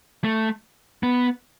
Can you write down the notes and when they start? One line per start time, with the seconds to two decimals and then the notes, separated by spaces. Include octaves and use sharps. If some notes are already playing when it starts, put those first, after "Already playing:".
0.24 A3
1.03 B3